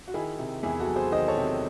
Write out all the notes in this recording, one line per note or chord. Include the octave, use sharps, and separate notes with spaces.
F#4
D#3 E4 G#4
C3
E2 E4 G#4
F#4 A4
F#3
G#4 C5
D#3 C5 D#5
A4 C#5
C3